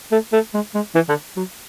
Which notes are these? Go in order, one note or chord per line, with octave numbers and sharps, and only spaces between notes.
A3
A3
G#3
G#3
E3
D3
F#3